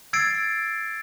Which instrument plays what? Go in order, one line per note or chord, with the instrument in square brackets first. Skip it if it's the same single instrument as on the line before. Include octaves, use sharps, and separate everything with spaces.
[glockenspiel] E6 G#6 A6 C7 D7